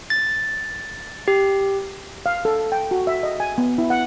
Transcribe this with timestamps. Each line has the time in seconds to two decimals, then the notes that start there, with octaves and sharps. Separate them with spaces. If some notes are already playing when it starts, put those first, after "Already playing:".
0.10 A6
1.28 G4
2.26 F5
2.45 A4
2.72 G5
2.91 F#4
3.07 E5
3.23 D#5
3.40 G#5
3.58 B3
3.78 E4
3.90 F#5